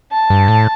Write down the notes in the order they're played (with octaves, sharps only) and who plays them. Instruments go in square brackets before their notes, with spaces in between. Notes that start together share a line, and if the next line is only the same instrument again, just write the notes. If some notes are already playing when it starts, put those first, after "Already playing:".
[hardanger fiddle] A5
[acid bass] G2
A2